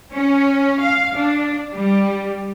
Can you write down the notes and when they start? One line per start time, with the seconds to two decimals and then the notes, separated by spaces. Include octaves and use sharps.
0.14 C#4
0.81 F5
1.17 D4
1.73 G3